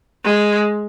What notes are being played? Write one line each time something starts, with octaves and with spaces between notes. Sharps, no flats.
G#3